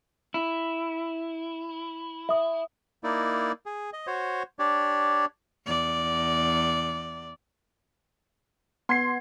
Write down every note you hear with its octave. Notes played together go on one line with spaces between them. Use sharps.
E4
E5 D#6
A#3 D#4 E4 D5
G#4
D#5
F#4 C5 C#5
D4 G4 C#5 D5
E2 D5
B3 C6 G#6 C7